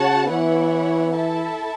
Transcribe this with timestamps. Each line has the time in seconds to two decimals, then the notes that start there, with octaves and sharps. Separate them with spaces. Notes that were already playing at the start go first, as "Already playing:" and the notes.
Already playing: C#3 F#4 C#5 F#5 A5
0.29 E3 B3 E4 C#5 F#5
1.14 E4 A4 E5 A5